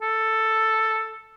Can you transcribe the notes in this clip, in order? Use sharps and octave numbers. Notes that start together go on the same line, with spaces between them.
A4